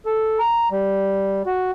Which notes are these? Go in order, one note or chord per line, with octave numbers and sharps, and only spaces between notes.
A4
A#5
G3
F#4